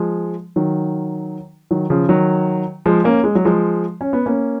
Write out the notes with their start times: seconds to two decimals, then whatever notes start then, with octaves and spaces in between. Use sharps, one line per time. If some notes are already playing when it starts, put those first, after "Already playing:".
Already playing: F3 G#3
0.56 D#3 F#3
1.71 D#3 F#3
1.90 C#3 F3
2.09 D#3 F#3
2.86 F3 G#3
3.04 A#3 C#4
3.24 G#3
3.35 F#3
3.45 F3 G#3
4.01 C#4
4.13 B3
4.26 A#3 C#4